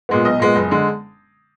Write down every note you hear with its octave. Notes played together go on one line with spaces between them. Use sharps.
A#2 G#3 B3
B1 D#5
A#2 G#3 B3
F#1
D3 G#3